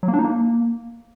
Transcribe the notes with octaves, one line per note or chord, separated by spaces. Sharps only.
F#3
A#3
D4
D#4
A#3